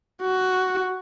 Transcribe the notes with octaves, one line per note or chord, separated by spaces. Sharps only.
F#4